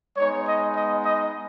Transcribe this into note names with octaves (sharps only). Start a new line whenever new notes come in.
G#3 B3 D#4 C#5
D#5
D#5
D#5